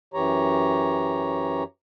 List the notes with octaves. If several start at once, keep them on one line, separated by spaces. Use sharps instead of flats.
F#2 E3 G4 C#5 A#5